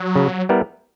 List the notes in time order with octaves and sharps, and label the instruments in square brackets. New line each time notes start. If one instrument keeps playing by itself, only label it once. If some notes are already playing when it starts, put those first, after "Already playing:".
Already playing: [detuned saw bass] F#3
[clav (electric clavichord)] C#3
G3 B3 E4 A#4